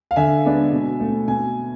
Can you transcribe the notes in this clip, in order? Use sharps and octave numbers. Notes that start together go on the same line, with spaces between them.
F5
D3 E5 G#5
G#3 B3 D4
B2
A3 C4
B2 G#5